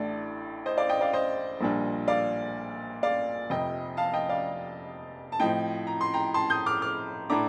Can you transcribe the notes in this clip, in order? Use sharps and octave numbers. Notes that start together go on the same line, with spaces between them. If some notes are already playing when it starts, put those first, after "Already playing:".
Already playing: A1 A2 A3 D4 D5
C5 D#5
D5 F5
D#5 G5
D5 F5
C5 D#5
A#1 A#2 G3 D4
D5 F5
D5 F5
F1 F2 C3 D#5 G5
F5 A5
D#5 G5
D5 F5
A5
A2 F3 C4 D#5 G5
A#5
C6
G5 A#5
A5 C6
D#6 G6
D6 F6
D6 F6
A2 A3 D4 A#5 D6